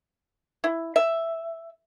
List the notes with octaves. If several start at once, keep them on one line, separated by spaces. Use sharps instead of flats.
E4
E5